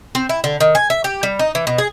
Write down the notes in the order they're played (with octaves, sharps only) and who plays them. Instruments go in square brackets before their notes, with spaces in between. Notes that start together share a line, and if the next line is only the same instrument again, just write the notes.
[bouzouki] C4
E4
D3
D#3
G#5
E5
G4
G3
D#4
E3
B2
G#4